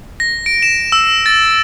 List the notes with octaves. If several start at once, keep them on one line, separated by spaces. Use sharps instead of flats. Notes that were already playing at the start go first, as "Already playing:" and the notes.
A#6
D7
E7
E6
A6